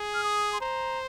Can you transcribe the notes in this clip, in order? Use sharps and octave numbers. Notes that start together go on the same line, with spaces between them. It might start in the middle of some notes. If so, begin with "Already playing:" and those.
Already playing: G#4
F6
D#6
C6
C5 A#5